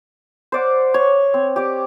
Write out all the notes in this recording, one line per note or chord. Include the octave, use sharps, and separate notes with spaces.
C5 D5 F#5
C#5
C4
G4 D5